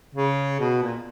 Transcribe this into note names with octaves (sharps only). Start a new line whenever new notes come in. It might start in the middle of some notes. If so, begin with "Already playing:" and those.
C#3
B2
A#2